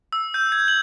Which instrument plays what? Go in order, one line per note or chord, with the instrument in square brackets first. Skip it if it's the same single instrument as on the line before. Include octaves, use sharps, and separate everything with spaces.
[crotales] E6
G6
G#6
F#7